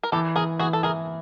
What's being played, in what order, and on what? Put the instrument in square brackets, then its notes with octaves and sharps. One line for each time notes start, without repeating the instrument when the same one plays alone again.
[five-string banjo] A#4
[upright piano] E3 [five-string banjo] G4 A4
[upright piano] E3 [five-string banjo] G#4 A#4
[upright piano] E3 [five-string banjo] F#4 G#4
[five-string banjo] A4
[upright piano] E3 [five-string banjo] G#4 A#4